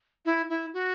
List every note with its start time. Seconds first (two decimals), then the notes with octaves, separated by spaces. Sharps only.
0.25 E4
0.49 E4
0.73 F#4